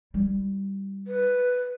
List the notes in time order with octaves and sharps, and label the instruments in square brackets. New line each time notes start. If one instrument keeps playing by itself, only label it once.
[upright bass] G3 E4
[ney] B4